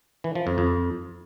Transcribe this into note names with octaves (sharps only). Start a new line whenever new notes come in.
E3
F3
F2
F2